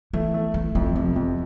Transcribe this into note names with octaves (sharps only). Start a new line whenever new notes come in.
E3 A3
A3
E3 A3
F2 F3
C3 F3
F2 E3